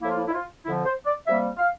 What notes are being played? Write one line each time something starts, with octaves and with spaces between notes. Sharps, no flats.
A2 F3 A#3 E4
F4
E4
E4
F4
F2 D3 F3 E4
C5
D5
C3 G3 A#3 E5
F5